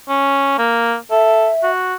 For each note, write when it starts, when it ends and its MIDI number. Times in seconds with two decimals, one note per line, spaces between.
0.09 0.57 61
0.58 0.96 58
1.11 1.49 69
1.11 1.71 76
1.63 1.95 66